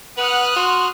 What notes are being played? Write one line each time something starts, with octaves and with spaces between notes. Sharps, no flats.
B4 F#5 D#6 F6 F#6
F#4 C6